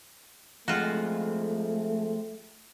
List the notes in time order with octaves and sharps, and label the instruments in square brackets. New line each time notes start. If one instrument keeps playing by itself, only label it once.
[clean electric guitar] F3 G#3 C4 [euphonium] A3 [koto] F4 F#4